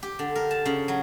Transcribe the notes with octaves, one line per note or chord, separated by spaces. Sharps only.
G4
D3
A#4
A5
C#3
F#3